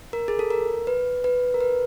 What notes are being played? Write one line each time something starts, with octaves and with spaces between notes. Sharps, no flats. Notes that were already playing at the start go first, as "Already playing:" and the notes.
A#4
G#4
A4
A#4
B4
B4
A#4
B4